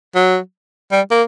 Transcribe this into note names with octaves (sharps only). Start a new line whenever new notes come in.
F#3
G3
A#3